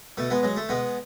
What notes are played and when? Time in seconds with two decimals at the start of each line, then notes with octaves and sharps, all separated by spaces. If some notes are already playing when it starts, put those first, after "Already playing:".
0.17 B2 A3
0.30 G#3 B3
0.43 F#3 G#3
0.57 A3
0.69 B2 G#3 B3